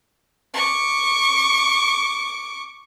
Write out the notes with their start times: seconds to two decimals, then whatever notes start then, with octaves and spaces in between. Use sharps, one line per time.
0.54 C#6 D6